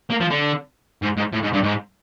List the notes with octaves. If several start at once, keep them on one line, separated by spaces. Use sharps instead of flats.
A#3
F3
D3
G#2
G#2
A2
G#2
G2
G#2